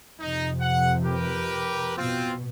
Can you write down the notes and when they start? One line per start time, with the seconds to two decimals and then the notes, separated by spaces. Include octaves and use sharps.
0.20 F2 C3 D#4
0.60 F#5
1.05 G4 A#4 B4
1.97 B2 C4 F4